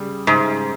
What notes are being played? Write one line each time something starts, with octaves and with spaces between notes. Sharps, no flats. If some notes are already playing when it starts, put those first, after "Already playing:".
Already playing: C#3 G3
G#2 C#3